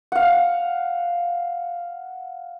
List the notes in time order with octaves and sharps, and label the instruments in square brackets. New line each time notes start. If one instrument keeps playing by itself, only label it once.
[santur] F5 F#5